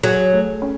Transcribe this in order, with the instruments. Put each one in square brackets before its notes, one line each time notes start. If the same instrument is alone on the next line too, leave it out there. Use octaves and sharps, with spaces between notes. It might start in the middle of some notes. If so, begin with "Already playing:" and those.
[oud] F#3 [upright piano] G#4
[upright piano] A3
C#4